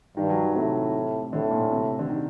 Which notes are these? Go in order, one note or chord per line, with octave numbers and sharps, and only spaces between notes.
G2 D#3
F#3
D#3
A2 C3
A2 D3
A#2
C3
D3
D#3